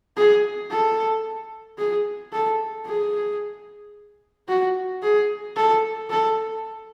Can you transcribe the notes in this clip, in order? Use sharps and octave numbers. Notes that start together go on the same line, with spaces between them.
G#4
A4
G#4
A4
G#4
F#4
G#4
A4
A4